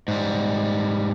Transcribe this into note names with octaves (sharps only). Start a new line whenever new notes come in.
G#2 G3